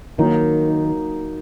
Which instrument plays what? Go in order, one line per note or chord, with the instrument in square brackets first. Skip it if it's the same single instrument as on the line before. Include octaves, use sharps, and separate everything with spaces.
[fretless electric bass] D#3 [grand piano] F#3 A#3 D#4